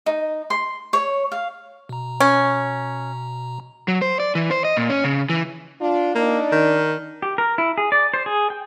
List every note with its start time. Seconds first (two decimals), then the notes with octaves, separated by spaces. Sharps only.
0.06 D#4
0.50 C6
0.93 C#5
1.32 F5
1.89 B2 A#5
2.20 C#4
3.88 F#3
4.02 C5
4.20 D5
4.35 E3
4.51 C5
4.65 D#5
4.77 A#2
4.90 C#4
5.04 C#3
5.30 E3
5.80 D4 F4
6.15 A#3 D4 D#4 D5
6.52 D#3
7.22 G4
7.38 A#4
7.58 E4
7.78 G#4
7.92 D5
8.14 C5
8.26 G#4
8.50 G5